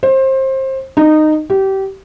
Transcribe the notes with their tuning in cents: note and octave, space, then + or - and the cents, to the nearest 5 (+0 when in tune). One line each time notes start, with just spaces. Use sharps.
C5 +25
D#4 -15
G4 -25